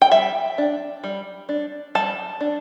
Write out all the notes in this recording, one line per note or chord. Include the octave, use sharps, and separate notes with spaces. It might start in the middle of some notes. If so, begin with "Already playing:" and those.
G5
G3 E5
D4
G3
D4
G3 A5
D4